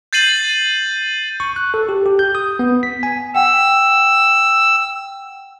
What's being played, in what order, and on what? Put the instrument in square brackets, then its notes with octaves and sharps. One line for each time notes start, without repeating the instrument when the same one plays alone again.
[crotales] G6 A6 C7 D#7 F#7
[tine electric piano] C#6
F#6
A4
G4
G4
G6
D#6
B3
B6
G#5
[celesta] F#5 G5 [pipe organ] E6